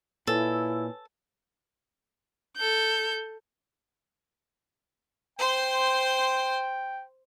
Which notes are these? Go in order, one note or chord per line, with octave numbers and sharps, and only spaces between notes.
A#2 E4 A4 B4 C#5 G#5
A4 G6
C5 G5 C6